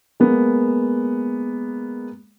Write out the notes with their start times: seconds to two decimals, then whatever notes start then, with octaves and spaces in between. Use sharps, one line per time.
0.20 G#3 A#3 B3